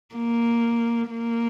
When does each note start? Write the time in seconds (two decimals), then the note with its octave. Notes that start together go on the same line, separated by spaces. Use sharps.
0.15 A#3
1.10 A#3